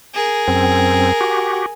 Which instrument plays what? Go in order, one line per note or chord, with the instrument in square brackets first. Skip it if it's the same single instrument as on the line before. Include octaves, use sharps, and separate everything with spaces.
[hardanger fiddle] G#4 A#4
[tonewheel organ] F#2 C4
F#4 G4